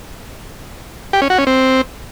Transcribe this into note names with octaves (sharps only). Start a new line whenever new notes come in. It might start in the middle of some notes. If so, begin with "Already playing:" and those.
G4
C#4
F#4
C#4
C4